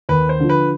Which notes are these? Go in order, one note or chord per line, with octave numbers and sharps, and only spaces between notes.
D#2 B4
C5
D3 F3
B4